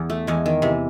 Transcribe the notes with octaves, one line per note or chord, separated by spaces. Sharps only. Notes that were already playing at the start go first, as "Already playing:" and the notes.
Already playing: E2
A3
E2 G#3
D#3
C3 E3